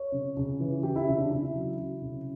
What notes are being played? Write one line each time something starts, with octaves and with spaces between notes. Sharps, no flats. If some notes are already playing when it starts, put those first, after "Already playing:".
Already playing: C#5
C#3
C#3
E3
E3 G4
E4
C#3
D4
C#3 E4
F#3
F#3
C#3